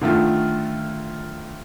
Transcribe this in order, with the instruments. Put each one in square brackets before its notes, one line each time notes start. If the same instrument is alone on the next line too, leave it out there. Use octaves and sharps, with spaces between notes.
[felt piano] D3 D#3 A3 F4